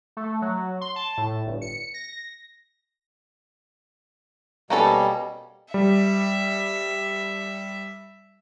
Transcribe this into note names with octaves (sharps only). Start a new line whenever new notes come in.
A3
F#3
C6
A5
A2
G1
C#7
A#6
B2 G3 A#3 C#4 A4
G3 E5